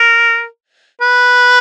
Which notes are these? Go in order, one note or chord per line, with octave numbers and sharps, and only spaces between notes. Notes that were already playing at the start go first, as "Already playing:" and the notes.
Already playing: A#4
B4